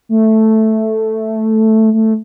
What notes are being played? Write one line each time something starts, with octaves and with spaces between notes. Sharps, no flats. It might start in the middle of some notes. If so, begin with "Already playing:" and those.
A3
A3